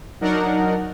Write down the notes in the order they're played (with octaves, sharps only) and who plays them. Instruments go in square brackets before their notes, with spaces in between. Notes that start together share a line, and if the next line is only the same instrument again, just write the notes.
[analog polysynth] F#3 D4 D#4 A#4 F#5